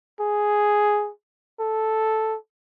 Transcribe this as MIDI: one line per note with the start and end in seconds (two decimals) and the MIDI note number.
0.20 1.10 68
1.60 2.36 69